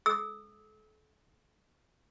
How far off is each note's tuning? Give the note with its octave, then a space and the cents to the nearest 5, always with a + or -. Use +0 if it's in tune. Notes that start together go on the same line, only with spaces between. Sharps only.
A4 -40 E6 -30